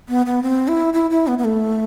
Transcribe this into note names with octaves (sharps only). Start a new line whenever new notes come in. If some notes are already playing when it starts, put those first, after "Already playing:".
B3
B3
C4
E4
E4
E4
B3
B3
A3